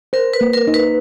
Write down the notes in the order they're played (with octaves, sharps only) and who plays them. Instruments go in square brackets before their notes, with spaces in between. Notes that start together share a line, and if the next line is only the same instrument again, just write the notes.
[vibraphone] A#4 [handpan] C5
[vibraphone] B4
[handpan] A#3
[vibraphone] A#4
[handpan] D#4
[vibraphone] B4